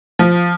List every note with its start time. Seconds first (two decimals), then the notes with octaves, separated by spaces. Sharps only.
0.19 F3